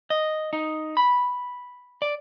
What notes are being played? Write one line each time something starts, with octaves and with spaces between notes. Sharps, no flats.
D#5
D#4
B5
D5